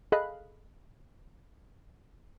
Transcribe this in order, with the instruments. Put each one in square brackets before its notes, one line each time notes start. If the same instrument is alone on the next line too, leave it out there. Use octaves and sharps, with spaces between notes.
[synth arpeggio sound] G#4 A4 D#5 F5 B5 F#6